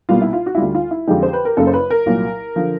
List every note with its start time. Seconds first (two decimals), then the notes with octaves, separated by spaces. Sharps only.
0.09 C2 B2 G3 A#3 F4
0.22 E4
0.33 F4
0.46 F#4
0.55 E4
0.58 D2 D3 G3 F4
0.75 F4
0.91 E4
1.08 F2 D3 F3 G#3 G4
1.23 C5
1.33 B4
1.45 A#4
1.57 F#1 F#2 C#3 F#3 A#3 A4
1.67 C5
1.73 B4
1.90 A#4
2.06 C2 A#2 F#3 A#3
2.56 D3 F3